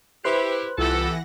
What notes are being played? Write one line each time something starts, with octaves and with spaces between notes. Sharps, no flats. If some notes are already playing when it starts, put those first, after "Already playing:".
E4 G4 B4 C5 F#6 C7
C2 E3 B3 F4 G4 A4 F#5 A#6